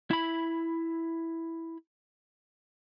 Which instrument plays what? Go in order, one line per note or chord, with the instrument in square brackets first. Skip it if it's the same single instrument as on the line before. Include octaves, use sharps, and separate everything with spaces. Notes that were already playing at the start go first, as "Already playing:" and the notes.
[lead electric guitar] E4 B5